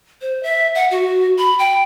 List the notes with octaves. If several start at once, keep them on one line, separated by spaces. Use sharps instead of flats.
C5
E5
F#5
F#4
B5
G5